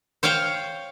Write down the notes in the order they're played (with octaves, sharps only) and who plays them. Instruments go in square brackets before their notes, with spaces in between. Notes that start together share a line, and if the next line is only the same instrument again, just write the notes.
[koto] C5 C#5 F5 G5